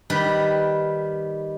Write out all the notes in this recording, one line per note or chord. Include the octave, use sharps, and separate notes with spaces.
D#3 G3 B4